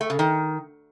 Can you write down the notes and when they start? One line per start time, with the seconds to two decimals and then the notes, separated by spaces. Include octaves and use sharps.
0.01 A3
0.10 C#3
0.19 D#3